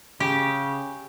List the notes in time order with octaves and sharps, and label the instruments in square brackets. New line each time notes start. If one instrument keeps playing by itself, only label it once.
[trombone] C#3 [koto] G4